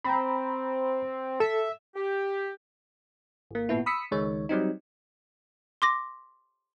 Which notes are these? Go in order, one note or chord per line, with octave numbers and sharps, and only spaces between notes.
C4 A#5 B5
A4 E5
G4
G#1 A#3
G#1 A#2 B3 E4
B5 D#6 E6 B6 C#7
C#2 D#3 G#3 C#5
F#3 G3 C4 D#4
C6 D6 A#6